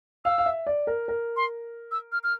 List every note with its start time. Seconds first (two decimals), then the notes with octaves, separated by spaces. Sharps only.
0.25 F5 E6
0.38 F5
0.46 E5
0.67 D5
0.87 A#4
1.08 A#4
1.36 C6
1.91 E6
2.12 F6
2.24 F6